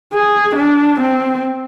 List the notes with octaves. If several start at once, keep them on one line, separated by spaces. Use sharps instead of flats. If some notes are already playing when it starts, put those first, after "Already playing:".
G#4
D4
C4